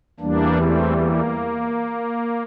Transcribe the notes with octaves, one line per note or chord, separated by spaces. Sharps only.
E2 E3 G3 A#3 D4
A3 C4
A#3